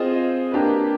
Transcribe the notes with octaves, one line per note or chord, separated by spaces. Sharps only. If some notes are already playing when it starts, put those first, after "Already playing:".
Already playing: C4 F4 G#4 C5 D#5
A#3 D4 G4 B4